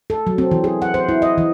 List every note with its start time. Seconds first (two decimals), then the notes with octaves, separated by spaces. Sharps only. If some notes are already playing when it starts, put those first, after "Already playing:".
0.10 A4
0.27 F#3
0.38 C4
0.51 E3
0.64 G#4
0.82 F#5
0.94 C5
1.09 E4
1.22 D#5
1.38 E3